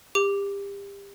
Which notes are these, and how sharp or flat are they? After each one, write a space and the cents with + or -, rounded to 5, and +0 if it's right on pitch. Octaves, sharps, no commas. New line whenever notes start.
G4 +30 D6 +0